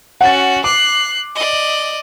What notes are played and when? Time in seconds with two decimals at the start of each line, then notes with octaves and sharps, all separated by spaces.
0.21 C#4 F#4 F#5 A6
0.64 D6 F#6 C7
1.35 D5 D#5